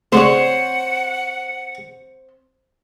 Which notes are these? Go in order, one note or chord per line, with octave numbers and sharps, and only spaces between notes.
A2 C#3 C4 F#4 C5 C#5 F#5